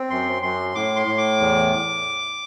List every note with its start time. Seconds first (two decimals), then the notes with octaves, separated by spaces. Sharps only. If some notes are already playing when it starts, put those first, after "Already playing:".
Already playing: C4
0.10 F#2 C6
0.42 F#2 C6
0.75 A2 D6
0.96 C6
1.07 A2
1.18 D6
1.40 E2